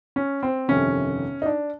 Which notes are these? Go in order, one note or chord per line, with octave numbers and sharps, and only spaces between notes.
C#4
C4
G1 F2 C3 D#3 C#4
D#4
D4